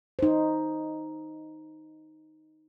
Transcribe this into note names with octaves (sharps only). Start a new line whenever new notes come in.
D#4 C5